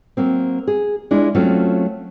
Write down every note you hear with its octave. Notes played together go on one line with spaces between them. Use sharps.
F#3 A#3 C4
G#4
G#3 D4 E4 F4
F#3 A3 C4 C#4 F4